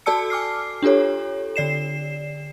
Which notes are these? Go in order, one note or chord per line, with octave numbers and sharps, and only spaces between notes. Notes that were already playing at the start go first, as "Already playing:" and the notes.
F#4 A4 D5 A5 E6 C#7
G#5 D6 F6 C7
D4 F4 G4 A4 C#5
D3 D5 C7 E7